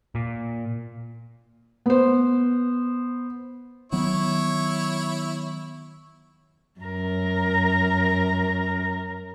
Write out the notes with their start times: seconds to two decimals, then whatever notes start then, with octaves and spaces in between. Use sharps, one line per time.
0.15 A#2
1.86 B3 C5
3.92 D#3 F#3 B3 E4 C#5
6.80 F#2 A#4